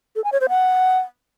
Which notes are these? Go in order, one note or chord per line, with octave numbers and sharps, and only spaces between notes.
A4
G#5
C#5
C5
F#5